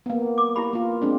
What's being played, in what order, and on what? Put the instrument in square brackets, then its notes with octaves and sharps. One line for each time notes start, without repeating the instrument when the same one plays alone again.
[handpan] A#3 B3
[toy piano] D6
E4 G4 B5
[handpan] A#3 F4
G#3 C4 D4